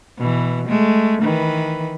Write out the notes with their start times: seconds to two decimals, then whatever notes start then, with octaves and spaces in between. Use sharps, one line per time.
0.18 B2 E3
0.68 G#3 A3
1.22 D#3 E3 B4